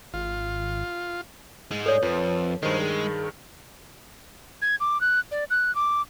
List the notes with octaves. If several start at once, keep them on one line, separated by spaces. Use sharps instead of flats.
G#1 F4
G#2 G#3
A4 C#5 D5
F2 F3 B4
G2 D#3 G#3 C5
G#4
G#6
D6
F#6
D5
F#6
D6